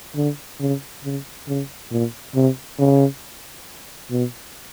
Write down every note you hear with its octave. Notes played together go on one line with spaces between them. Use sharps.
D3
C#3
C#3
C#3
A#2
C3
C#3
B2